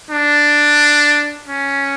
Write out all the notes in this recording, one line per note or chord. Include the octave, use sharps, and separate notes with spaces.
D4
C#4